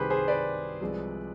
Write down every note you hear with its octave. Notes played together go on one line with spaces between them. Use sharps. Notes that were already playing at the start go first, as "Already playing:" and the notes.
Already playing: C2 C3 D#3 G3 G4 G#4 B4 C5
G#4 C5
B4 D5
C2 C3 F3 G#3